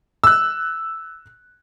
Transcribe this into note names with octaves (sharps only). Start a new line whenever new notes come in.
E6 F#6